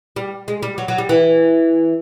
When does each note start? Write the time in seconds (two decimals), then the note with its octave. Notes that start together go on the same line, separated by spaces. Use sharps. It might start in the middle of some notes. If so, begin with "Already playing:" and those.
0.16 G3
0.48 G#3
0.63 G3
0.78 F#3
0.88 F#3
0.98 G3
1.09 E3